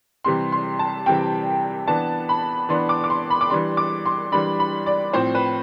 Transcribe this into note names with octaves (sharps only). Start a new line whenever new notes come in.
C3 E3 G3 C4 C6
C6
A5
C3 E3 G3 C4 G5
E3 B3 D4 A5
B5
E3 B3 D4 C6
D6
D6
C6
B5
D6
E3 G3 D4 C6
D6
C6
E3 G3 D4 B5
B5
D5
A2 F3 C4 C5
B4